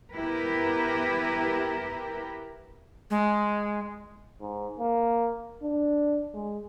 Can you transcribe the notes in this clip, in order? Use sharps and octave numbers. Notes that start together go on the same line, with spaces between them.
B3 E4 G4 A#4 B4
G#3
G#2
A#3
D4
G#3